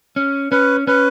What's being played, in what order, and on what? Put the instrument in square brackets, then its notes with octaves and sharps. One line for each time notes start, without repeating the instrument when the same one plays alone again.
[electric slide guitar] C#4
[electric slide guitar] C#4 [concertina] B4
[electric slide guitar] C#4 [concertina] B4